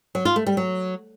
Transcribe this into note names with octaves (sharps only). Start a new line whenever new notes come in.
F#3
F4
A3
G3
F#3